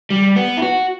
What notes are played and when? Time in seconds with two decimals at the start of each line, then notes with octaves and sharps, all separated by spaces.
0.10 G3
0.36 B3
0.57 E4
0.62 F#4